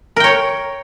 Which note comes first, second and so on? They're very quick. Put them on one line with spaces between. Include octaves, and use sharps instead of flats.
A#4 G5 C#5